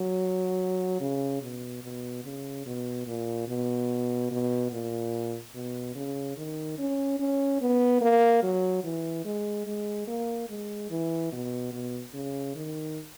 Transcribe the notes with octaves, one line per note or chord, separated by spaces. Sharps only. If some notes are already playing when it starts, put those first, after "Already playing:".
Already playing: F#3
C#3
B2
B2
C#3
B2
A#2
B2
B2
A#2
B2
C#3
D#3
C#4
C#4
B3
A#3
F#3
E3
G#3
G#3
A#3
G#3
E3
B2
B2
C#3
D#3